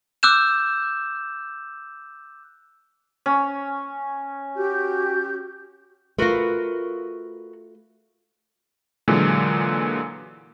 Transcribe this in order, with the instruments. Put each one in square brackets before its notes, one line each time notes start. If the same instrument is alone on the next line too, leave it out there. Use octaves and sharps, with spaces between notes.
[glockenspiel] D6 E6 F#6 G6 E7
[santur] C#4
[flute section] F#4 G4 G6
[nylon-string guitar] A3 F4 [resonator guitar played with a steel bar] F#4 A#4 B4
[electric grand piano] A#2 D3 E3 F#3 G#3